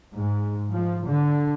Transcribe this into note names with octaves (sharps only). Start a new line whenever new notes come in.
G#2
F3
D3